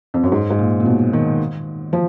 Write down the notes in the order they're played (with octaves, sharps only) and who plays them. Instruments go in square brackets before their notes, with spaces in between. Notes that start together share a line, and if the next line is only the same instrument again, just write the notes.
[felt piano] F2
F#2
G#2
G#2
A#2
A#2
B2
D#3
F3